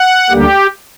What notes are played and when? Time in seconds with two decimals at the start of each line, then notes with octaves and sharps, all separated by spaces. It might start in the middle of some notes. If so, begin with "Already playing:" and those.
Already playing: F#5
0.30 D2 D3 G3 A#3 G4